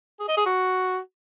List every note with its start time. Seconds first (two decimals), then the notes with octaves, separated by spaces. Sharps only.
0.20 G#4
0.28 D#5
0.37 G#4
0.46 F#4